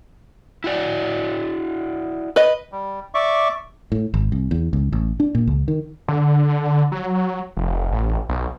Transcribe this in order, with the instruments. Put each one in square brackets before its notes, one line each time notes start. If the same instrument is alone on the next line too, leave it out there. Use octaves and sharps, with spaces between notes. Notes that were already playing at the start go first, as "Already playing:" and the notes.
[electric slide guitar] E4 F#4 D5
[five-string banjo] B4 D#5
[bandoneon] G3
D5 E5 C#6 D6
[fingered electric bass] A2
G#1
C2
E2
C#2
A1
D4
A#2
C#2
D#3
[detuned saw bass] D3
F#3
F1
A1
B1